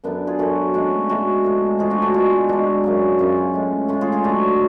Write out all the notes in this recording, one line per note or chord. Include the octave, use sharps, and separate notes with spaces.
F#2 D3 F#3 B3 D4
F4 G#4
F#2 D3 F#3 F#4 A4
A2 G#3 D4 F#4
A2 G#3 F#4 A4
A2 F3 G#3
A2 F3 G#3 F4 G#4
D4 F#4
F#4 A4
B2 G#3 F4 G#4
B2 G#3 D4 F#4
F#2 C#3 F#3
F#2 C#3 F#3 C#4 F4
A2 G#3
A2 G#3 C#4 F4
F4 G#4
F4 G#4
A2 F#3 D4 F#4